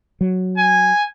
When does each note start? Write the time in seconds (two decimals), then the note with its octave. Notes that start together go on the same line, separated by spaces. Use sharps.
0.21 F#3
0.58 G#5